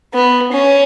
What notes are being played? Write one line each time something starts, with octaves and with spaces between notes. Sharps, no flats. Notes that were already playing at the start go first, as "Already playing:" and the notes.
B3
C#4